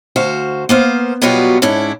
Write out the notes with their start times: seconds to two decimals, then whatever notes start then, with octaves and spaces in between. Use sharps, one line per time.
0.16 D2 F#4 C5 F5
0.69 A#3 B3 C5 F5
1.22 B2 F#3 G3 B3 F4 F#4
1.62 G#2 C#4 D4 E4